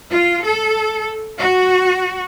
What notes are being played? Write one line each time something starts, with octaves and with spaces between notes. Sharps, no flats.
F4
A4
F#4